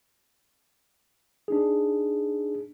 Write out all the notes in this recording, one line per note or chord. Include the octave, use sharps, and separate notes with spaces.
D4 D#4 G#4